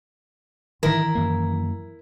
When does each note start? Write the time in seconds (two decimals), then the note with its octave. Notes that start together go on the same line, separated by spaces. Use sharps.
0.83 D#3 E3 E4 A#4
1.15 F#2 A#3